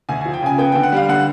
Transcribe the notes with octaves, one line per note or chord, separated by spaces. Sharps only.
D2 G#5
F3 G#5
G5
C#3 G#5
B3 G5
D3 G5
F#5
G3 F5
D3 F#5